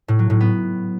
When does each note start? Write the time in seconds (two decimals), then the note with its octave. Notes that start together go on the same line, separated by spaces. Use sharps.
0.08 A2
0.19 F#3
0.30 A2
0.41 B3